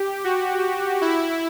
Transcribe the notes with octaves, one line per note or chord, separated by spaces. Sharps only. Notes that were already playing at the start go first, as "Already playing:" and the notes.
Already playing: G4
F#4
E4